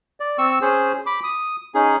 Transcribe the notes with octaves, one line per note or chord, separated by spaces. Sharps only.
D5
C4 C#6 E6
C#4 G#4 C5
B5 D6
D#6
C#4 D#4 G#4